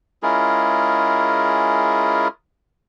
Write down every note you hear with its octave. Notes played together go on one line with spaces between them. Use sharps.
G#3 C#4 E4 F4 G#4 A#4